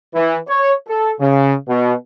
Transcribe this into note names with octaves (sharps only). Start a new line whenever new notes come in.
E3
C#5
A4
C#3
B2